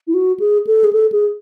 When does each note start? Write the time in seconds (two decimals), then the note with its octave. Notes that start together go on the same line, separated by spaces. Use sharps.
0.07 E4
0.14 F#4
0.40 G#4
0.67 A4
0.84 G#4
0.93 A4
1.12 G#4